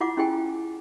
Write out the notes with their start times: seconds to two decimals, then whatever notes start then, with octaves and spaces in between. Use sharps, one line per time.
0.01 E4 F4 F#5 D6
0.17 C#4 E4 G#4 G5 G#5